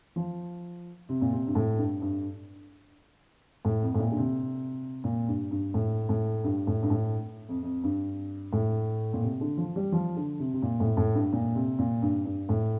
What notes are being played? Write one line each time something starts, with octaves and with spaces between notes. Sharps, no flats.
F3
C3
A#2
C3
G2
A2
G2
G2
A2
F2
A2
A#2
D3
C3
A#2
G2
G2
A2
A2
G2
A2
G2
A2
F2
F2
G2
A2
A#2
C3
D3
F3
G3
F3
D3
C3
C3
A#2
A2
A2
G2
A#2
C3
A#2
G2
G2
A2